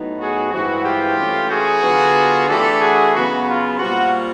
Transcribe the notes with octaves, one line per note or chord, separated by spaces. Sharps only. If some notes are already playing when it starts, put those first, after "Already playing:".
Already playing: A2 F#3 B3 D#4
F#4 G#4
G2 E3 G#3 C4 E4 F#4
F4 G4
E3 A3 C#4
F#4 G#4
D3 F#3 B3 D4 F4
E3 A3 D4 G4 A4
F#4 G#4
C#3 F#3 B3 F#4
F4
A#2 G3 C4 F4 F#4